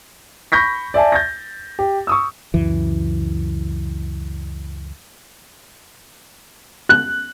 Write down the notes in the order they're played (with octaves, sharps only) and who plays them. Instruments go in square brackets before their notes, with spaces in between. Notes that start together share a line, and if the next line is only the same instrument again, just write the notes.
[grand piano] B5 C#6 G6 A#6 B6
D5 E5 G#5 A5
G6 A6 A#6
G4
C#6 D#6 E6
[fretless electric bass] C#2 F#2 E3
[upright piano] F#6